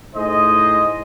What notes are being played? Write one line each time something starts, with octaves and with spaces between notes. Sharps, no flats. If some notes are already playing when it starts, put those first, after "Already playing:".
A2 D#4 G#4 C5 D#5